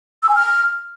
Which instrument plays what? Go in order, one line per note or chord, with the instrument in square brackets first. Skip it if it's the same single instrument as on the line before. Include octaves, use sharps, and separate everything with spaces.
[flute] E6
G#5
F6